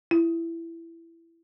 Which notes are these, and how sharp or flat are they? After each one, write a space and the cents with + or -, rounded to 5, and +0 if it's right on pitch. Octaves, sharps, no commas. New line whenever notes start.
E4 +15